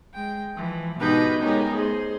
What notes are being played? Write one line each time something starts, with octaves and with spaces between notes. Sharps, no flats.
G#3 G5
E3 F3
G#2 B2 D#4 G4 B4 G6
G#3 B3 C#4 D#4 G4 A#4
G#4 C5